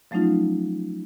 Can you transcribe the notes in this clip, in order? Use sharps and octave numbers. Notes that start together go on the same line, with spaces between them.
F3 F#3 A3 C#4 D#4 F4